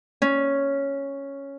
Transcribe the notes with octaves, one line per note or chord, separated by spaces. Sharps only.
C#4